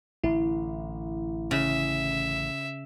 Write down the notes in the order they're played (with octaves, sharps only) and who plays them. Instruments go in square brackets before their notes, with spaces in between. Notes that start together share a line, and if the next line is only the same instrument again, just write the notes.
[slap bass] A1 D3 [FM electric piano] E4
[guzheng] C#3 [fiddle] E5